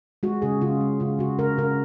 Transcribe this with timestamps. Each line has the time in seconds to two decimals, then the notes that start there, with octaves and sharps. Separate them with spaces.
0.23 G#3 F#4
0.42 C#3 G#4
0.61 C#3 F4
0.81 G#3
1.00 C#3 F4
1.19 C#3 F#4
1.38 C#3 A#4
1.58 C#3 A#4